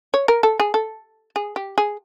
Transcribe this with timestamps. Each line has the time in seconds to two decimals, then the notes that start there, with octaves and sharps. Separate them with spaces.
0.14 C#5
0.28 A#4
0.43 A4
0.60 G#4
0.74 A4
1.36 G#4
1.56 G4
1.78 G#4